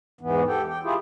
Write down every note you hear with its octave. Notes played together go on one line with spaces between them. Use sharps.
E2 G#2 E3 B3
G4 A4 G5
G5
E4 F4 G4 G#4